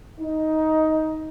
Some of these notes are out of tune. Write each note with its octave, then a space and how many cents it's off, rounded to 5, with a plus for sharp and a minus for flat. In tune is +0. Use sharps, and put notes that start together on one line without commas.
D#4 +10